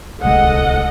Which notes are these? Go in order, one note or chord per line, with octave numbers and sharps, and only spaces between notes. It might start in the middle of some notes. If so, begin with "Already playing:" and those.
D1 C2 G#3 A4 D#5 F#5